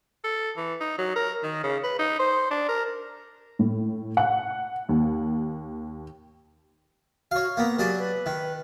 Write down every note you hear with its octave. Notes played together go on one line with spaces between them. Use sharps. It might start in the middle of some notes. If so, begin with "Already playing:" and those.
A4
E3
D#4
F#3
A#4
D#3
C#3
B4
D#4
C5
D4
A#4
A2
F#5
D#2
F#4 C#5 F5
A#3 B3 A#4
F#3 G4 G#4 D5
B4
D#3